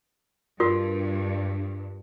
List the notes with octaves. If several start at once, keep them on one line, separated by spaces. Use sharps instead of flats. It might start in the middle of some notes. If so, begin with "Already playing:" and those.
G2 F4 F#4 A#4